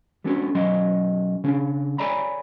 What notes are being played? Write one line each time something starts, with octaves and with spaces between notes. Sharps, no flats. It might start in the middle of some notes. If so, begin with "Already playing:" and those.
G3 B3 C#4 D4 F#4 A4
B1 F#3 C#4 D#5 C6
C#3 C#4 D4
A4 C#5 D5 G#5 A#5 B5